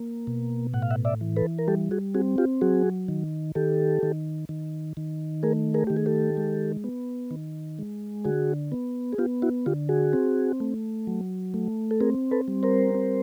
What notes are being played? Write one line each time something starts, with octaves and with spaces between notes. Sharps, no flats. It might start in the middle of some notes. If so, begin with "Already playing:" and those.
Already playing: A#3
B2
A2 F#5
F5
E5 F#5
D5 E5
E3
A4 B4
A#4
G3 G4 A4
F#4 G#4
C4 F#4 G#4
F4 G4
F#3 F#4 G#4
D#3
D#3 G4 A4
D#3
D#3
D#3
A3 G#4 A#4
G#4 A#4
D#3 G4
G#4
G4 A4
G#3
B3
D#3
G#3
D3 F#4 G#4
B3
G#4
B3 F4 G4
E4 F#4
D3 F4 G4
F#4 G#4
C4
A3
F#3
A3
A4
C4 G#4 A#4
A4 B4
G3
A#4 C5
C4